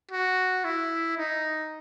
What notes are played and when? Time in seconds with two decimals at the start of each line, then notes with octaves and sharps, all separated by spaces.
0.11 F#4
0.64 E4
1.18 D#4